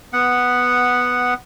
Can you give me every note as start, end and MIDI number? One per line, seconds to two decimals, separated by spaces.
0.13 1.34 59
0.13 1.34 78